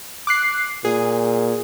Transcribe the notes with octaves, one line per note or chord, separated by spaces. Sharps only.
D6 F#6 C7
A#2 G#4